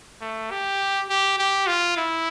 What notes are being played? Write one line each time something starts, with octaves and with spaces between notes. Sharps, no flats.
A3
G4
G4
G4
F4
E4